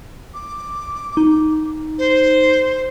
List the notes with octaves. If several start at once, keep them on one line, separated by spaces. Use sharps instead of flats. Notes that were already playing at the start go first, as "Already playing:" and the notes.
D6
D#4
C5